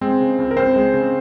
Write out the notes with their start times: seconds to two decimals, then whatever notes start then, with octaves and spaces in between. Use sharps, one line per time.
0.01 G#3 C4 C5
0.21 C#3
0.38 C#2
0.51 A#4
0.57 C#2 C4 C5
0.76 G#3
0.94 C#3